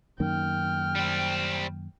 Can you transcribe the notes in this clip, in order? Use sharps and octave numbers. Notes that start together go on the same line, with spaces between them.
F#2 D#3 A#3 G5 F6
G3 C4